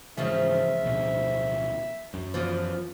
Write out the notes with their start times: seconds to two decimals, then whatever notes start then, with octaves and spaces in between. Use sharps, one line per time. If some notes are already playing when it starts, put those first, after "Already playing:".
0.18 G#2 C#3 E3 F3 E5
0.83 D1 B2
2.14 F#2
2.34 E2 E3 F3